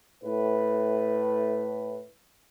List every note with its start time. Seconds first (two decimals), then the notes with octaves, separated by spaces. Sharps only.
0.24 A2 B4